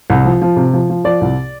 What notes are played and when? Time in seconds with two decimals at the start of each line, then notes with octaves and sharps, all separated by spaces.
0.10 C2
0.25 F3
0.42 F3
0.56 C3
0.73 F3
0.90 F3
1.04 F3 D5
1.21 C2